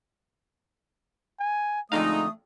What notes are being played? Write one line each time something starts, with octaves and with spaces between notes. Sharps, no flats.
G#5
F2 D3 G#3 A3 D#4 F5 D#6